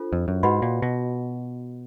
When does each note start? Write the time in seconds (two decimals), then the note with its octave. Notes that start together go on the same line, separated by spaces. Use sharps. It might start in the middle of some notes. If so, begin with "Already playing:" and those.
Already playing: D4 F4 A4 C5
0.13 F2
0.28 F#2
0.43 G#2 F#4 B4 D#5 F#5 B5
0.62 A#2
0.82 B2